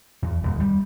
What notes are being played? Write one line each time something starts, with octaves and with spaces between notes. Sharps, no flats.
E2
D#1
G3